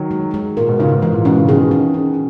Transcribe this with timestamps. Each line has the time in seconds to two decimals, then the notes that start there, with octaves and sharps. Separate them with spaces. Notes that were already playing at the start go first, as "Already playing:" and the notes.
Already playing: D#3 F#3
0.11 G#3
0.34 G#3
0.57 A#2 A#4
0.68 G#2 B2
0.79 A#2 C#3 D#4
0.92 G#2 B2
1.02 G#2 E3
1.14 A#2
1.25 G#2 B2 C#4
1.37 A#2 C#3
1.48 B2 D#3 G#4
1.71 C#4
1.94 C#4